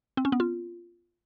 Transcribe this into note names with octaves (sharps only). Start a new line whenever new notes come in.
C4
C#4
B3
F4